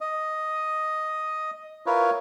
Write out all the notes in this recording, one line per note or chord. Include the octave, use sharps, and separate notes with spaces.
D#5
E4 F4 A#4 B4 C#5